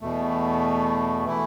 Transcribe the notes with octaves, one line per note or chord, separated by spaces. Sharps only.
E2 B2 A3
E3 A3 E4